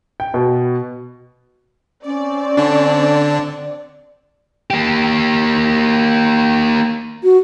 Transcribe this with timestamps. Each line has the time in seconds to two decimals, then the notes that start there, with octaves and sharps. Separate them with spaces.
0.20 G5
0.34 B2
2.05 C4 C#4 D5
2.57 D3 D4
4.70 A#3 G4
7.23 F#4